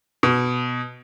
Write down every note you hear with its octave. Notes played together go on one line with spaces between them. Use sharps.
B2